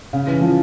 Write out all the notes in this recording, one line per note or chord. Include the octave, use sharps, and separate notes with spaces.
C#3
E3
F3